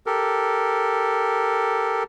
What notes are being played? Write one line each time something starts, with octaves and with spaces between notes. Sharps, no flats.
G4 A4 A#4